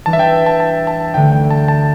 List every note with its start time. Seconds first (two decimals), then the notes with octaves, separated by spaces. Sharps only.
0.06 E3 G3 D4 A5
0.13 E5
0.19 G5
0.46 A5
0.60 A5
0.87 A5
1.14 D2 D3 A3 G5
1.32 G5
1.51 A5
1.68 A5